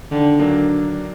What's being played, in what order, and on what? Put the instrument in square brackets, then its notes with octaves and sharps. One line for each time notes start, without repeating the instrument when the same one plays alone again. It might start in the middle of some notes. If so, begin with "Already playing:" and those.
[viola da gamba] D3 [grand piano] D#3
[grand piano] F#3 A#3 D4